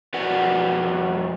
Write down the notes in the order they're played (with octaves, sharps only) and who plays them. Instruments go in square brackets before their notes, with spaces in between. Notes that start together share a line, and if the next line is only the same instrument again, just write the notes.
[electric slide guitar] F2 F#4 B4 D5 F#5